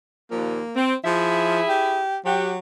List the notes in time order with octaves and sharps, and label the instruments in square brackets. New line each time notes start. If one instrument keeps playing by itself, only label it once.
[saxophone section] D#2 A#2 F3 [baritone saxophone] A#3
[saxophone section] C4
[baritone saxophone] F3 [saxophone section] E4 G#4 E5
[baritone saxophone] G4
[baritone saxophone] F#3 [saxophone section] F#4 G4